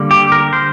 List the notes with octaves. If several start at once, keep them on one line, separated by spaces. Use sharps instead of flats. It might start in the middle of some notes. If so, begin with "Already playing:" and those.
Already playing: D3 G3 A#3
G4
A#4
C5